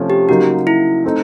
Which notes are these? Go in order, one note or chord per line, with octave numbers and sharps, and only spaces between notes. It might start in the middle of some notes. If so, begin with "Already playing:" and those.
Already playing: C3 F3 A3 C#4
G4
C#3 F#3 A#3 D#4 F#4
E4
A3 C4 D#4